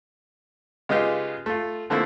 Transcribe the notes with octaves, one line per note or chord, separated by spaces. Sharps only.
C#3 G#3 B3 D#4 F4 G4
A3 F4
D3 F3 A3 A#3 C4 E4